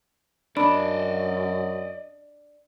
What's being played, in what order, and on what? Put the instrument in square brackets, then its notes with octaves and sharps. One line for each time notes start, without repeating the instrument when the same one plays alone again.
[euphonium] F#2 [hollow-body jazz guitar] D4 [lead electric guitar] D5 D#5 [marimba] B5